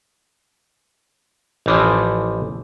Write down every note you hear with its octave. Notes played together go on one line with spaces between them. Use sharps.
A1 E3 F3